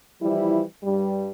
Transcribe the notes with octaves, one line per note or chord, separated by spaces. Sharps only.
E3 F3 G3 E4
G2 G3